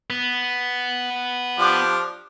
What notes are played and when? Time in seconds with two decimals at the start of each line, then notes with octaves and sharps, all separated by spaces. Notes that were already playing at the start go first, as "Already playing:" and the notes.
0.10 B3
1.58 F3 D4 G4